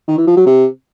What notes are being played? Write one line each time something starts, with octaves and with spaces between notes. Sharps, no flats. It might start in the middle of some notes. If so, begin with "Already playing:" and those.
D#3
E3
F3
F#3
C3